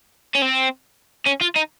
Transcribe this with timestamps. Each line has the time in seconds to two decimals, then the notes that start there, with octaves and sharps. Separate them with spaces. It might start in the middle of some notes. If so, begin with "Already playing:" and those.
0.35 C#4
0.42 C4
1.27 C#4
1.41 F4
1.56 D#4